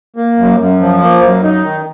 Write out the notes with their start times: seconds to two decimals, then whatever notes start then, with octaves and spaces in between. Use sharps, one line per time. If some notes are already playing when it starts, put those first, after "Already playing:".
0.16 A#3
0.38 F#2
0.59 F#2
0.80 F3
1.02 A#3
1.22 F#2
1.44 D#4
1.64 D#3